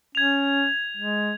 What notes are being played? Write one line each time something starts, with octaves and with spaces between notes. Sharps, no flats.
C#4 G#6 F7
G#3